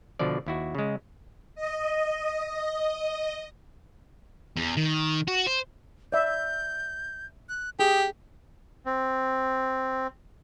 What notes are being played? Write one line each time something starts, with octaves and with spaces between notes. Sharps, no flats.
B2 D3 F3 D5
D#2 E4 F#4
C#3 G#3
D#5
D#5
E2
D#3
F#4
C5
D5 E5 G6
F#6
G4 G#4 D#6
C4